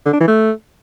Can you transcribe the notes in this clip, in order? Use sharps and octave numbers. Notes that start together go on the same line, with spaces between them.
D3
D4
E3
A3